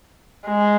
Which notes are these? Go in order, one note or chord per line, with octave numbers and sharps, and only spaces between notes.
G#3